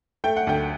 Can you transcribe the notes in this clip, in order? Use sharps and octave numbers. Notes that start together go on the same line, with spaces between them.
A3 G5
F#5
D2 G5